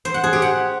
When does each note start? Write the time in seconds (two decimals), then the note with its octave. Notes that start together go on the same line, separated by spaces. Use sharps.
0.05 C5
0.14 F#5
0.24 G#4
0.33 G4
0.42 F#5